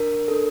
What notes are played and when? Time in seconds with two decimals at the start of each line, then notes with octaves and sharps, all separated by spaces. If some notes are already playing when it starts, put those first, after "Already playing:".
Already playing: D4 A#4
0.28 D4 A4